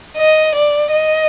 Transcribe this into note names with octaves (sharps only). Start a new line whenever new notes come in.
D#5
D5
D#5